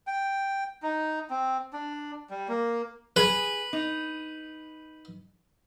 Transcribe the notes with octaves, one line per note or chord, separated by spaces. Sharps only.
G5
D#4
C4
D4
G3
A#3
G#4 B4
D#4